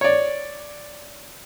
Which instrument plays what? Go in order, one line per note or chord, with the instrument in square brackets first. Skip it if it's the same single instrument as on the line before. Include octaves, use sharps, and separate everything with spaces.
[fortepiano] C#5 D5